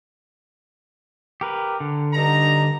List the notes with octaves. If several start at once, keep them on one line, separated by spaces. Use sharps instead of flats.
G4 A#4 B4
D3
G2 D#4 A#5